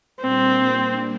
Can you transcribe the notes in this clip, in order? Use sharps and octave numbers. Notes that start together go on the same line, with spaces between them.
A#2 G3 A#3 C4 D4